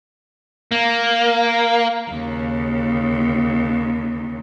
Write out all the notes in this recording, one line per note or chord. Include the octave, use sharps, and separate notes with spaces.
A#3
D#2 C#3